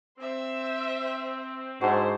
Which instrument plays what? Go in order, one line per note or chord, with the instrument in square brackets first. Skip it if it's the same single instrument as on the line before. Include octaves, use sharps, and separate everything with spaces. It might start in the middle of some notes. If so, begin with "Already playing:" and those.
[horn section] C4 [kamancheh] C5 E5
[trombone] G#2 [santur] D4 F#4 [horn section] E4 C5